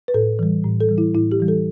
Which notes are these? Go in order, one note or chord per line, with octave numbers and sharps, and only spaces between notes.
B4
A2 A4
E3 G3
A2
A4
E3 G3
E4
A2 E4
G4
E3 G3
A4